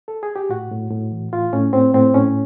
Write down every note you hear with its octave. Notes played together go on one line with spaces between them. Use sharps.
A4
G#4
G4
A2 F#4
A2
A2
E3
A2 F4
A2 C#4
A2 C4
A2 C4
A2 C#4